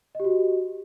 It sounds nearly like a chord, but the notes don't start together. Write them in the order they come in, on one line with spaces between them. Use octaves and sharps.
D#5 G4 F#4